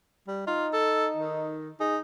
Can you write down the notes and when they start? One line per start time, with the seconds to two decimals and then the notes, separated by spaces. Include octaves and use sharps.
0.28 G3
0.47 D#4 F4
0.73 A4
1.16 D#3
1.80 D#4 G#4